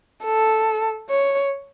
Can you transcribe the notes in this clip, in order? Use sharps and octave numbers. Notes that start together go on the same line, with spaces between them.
A4
C#5